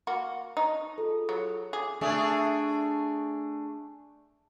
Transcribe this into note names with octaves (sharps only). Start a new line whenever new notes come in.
A#3 F#4
D#4 A5 C#6
F4 G#4 A4
F#3
G#4 D6 D#6
A3 D4 G#4